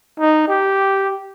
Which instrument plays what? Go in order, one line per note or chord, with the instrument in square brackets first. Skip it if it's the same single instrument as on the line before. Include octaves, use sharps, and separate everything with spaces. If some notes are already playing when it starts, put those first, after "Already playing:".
[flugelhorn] D#4
G4